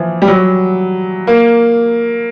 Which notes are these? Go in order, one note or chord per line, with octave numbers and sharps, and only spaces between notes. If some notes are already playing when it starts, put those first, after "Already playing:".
Already playing: E3 F3
G3
F#3
A#3